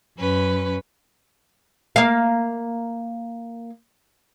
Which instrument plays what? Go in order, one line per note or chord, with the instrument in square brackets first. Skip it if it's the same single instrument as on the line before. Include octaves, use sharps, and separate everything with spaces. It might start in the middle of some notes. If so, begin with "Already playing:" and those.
[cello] F#2 [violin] C#4 B4
[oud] A#3 F5